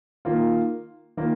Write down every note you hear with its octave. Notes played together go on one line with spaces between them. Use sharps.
D#3 A#3 F4
D#3 A#3 F4